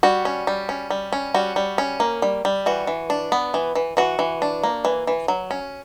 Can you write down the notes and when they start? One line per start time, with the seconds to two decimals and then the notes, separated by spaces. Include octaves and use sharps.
0.03 G3 F#4
0.25 C#4
0.47 G3
0.69 C#4
0.90 G3
1.13 C#4
1.34 G3 F#4
1.56 G3
1.78 C#4
2.00 A#3
2.22 G3
2.45 G3
2.66 E3 F#4
2.87 E3
3.10 D4
3.32 B3
3.54 E3
3.75 E3
3.97 E3 F#4
4.19 E3
4.42 D4
4.63 A#3
4.85 E3
5.07 E3
5.28 F#3
5.51 C#4